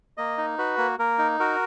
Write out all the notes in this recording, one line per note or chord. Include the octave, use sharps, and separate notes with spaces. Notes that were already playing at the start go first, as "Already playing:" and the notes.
A#3 D#5
D#4
F#4 B4
A#3
A#3 A#4
D#4
F#4 A#4